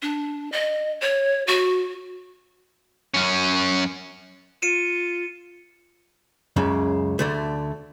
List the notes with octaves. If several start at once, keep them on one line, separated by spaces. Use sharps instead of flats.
D4
D#5
C#5
F#4
F#2 C#4
F4 C#7 D#7 E7
C#2 F#2 C#3
D2 D3 A3